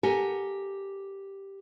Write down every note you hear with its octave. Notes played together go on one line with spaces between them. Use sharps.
G4 A4 A#4 F#5 G#5